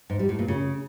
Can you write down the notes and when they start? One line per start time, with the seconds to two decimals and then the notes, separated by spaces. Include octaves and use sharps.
0.10 G#2
0.19 G3
0.29 A2
0.39 A#2
0.48 C#3